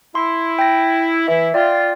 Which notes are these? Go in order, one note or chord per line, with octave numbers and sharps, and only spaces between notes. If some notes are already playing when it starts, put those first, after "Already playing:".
E4 C6
G5 A#6
E3 E4 E5
F4 D5 G5